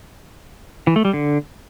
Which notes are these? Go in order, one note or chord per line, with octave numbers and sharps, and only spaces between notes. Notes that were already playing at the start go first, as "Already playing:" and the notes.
E3
A3
G3
D3